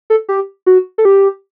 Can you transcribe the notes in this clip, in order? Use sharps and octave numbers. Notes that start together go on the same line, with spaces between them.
A4
G4
F#4
A4
G4